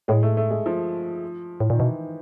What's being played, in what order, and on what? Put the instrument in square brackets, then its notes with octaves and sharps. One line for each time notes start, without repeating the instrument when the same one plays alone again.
[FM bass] A2 [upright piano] G#3
[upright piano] A3
A3
G#3
F3
[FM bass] A2
[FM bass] A#2 [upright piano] D#3
[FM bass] B2 [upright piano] E3